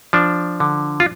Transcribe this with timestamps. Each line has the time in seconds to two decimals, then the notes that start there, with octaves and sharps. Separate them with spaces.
0.13 F3 D4
0.60 D3
1.00 F4